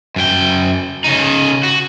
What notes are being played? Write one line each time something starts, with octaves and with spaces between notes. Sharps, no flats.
F#2 G5
C#3 D#4
F#4